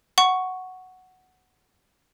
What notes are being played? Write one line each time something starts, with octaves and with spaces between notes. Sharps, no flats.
F#5 C#6